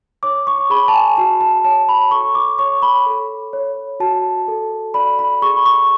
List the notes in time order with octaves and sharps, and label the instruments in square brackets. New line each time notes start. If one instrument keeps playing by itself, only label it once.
[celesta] C#5 D6
C#6
G#4 B5
A5
G#5
F#4 A5
A5
C#5 A5
B5
A4 C#6
D6
C#5 C#6
B5
A4
C#5
F#4 A5
A4
D5 B5
B5
G#4 C#6
B5
C#6